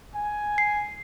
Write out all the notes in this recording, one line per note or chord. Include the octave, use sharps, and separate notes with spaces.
G#5
C7